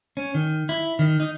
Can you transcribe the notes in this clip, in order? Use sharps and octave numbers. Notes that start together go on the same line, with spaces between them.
C#4
D#3
E4
D#3
D#4